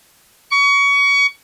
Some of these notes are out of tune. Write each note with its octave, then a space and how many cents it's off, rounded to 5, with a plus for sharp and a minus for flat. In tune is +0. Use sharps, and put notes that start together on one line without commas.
C#6 +25